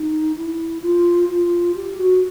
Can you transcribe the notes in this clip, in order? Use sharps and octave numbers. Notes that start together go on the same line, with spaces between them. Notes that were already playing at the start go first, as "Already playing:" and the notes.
Already playing: D#4
E4
F4
F4
G4
F#4